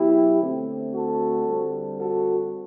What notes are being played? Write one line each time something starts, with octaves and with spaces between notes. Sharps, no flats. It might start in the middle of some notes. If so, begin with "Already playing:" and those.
Already playing: B2 F#3 B3 E4 G4
D3 A3 C4
F#4 A4
D3 G3 C4
F#4 A4